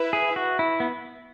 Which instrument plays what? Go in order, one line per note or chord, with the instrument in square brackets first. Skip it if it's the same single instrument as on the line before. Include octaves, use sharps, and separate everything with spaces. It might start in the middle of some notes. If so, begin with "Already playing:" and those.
Already playing: [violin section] E4 B4 E5
[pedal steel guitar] G#4
F#4
E4
B3